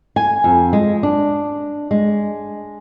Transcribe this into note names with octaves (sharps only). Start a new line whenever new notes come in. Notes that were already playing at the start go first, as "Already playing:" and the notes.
G#5
F2
G#3
D4
G#3